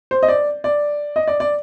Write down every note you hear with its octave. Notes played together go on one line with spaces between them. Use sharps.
C5
D#5
D5
D5
D#5
D5
D5